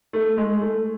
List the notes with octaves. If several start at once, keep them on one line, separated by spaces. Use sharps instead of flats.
A3
G#3
A3